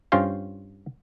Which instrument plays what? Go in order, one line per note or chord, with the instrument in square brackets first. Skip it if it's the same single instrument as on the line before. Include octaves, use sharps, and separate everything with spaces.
[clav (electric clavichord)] G2 C#4 F4 C5 F5 G5